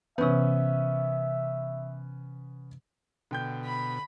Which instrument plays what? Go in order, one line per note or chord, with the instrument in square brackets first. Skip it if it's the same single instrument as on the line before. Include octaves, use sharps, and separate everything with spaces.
[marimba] C3 E3 [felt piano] B3 C#4 [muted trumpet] E5
[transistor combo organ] B2 [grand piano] D3 G5 G6
[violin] B5